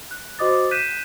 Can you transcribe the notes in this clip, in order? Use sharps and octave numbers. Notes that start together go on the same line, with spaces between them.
F#6
F#4 C5 D#5 D6 D#6 A6
F#6 G6 B6 D#7 E7